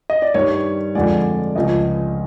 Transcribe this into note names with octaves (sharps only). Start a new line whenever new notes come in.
D#5
D5
G2 D#3 G3 C#5
F2 D3 F3 G#3 D5
C#2 C#3 F3 D#5